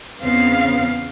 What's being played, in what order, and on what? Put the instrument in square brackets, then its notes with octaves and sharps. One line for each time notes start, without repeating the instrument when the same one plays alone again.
[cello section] E2 C#3 B3 C4 F5